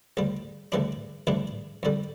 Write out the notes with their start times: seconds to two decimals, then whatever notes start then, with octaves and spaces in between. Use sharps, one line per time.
0.17 D2 C#3 G3
0.72 D2 C#3 E3 G3 D4
1.27 D2 C#3 E3 G3 D4
1.83 F2 D3 G3